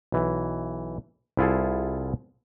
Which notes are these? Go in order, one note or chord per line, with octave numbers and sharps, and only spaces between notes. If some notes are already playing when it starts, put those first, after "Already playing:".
B1 E3
C2 E4 F4 G#4 A4